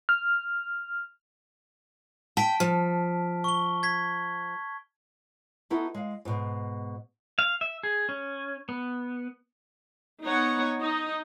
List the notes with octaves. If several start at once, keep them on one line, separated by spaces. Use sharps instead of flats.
F6
G5 A5 B6 D7
F3 F6
C#6 G7
G#6 B6
B3 D#4 E4 F#4 A4
G#3 F5
G#2 B2
F5
E5
G#4
C#4
B3
B3 D#4 C#5 F#5
D#4